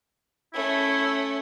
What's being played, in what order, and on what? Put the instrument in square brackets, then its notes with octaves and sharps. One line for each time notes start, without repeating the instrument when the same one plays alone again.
[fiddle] A3 C#4 [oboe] E4